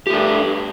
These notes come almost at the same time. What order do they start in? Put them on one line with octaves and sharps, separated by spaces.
G4 A3 D4